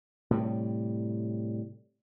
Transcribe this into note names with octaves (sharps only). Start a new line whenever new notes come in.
A2 C3 G3